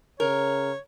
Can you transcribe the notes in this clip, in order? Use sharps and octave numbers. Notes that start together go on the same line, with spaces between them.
C#3 A#4 C#5